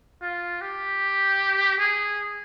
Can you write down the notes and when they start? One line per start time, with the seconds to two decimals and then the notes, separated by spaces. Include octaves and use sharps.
0.22 F4
0.61 G4
1.79 G#4